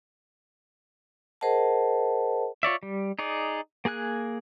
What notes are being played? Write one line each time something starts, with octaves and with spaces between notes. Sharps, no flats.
G#4 A#4 C5 D#5 F#5 A5
F4 C#5 D5 E5
G3
D#4 G#4 D5
A#3 G#4 G#5 F#6